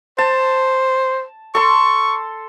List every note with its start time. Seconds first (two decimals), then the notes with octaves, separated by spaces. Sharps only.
0.18 C5 A5
1.55 A4 C6 C#6